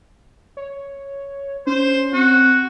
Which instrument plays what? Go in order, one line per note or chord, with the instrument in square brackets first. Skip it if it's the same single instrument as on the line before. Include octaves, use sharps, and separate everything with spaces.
[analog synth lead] C#5
[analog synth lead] C#4 [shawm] C5
[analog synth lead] C4 [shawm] F#4